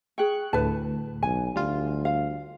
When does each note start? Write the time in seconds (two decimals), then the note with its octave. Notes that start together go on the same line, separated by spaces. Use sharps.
0.18 G#4 G5 C#6 F#6
0.53 D2 A2 B4 A5
1.23 B1 G#5
1.56 D2 G3 F4
2.05 F5